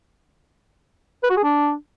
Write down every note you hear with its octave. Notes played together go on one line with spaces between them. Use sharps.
B4
F#4
G#4
D4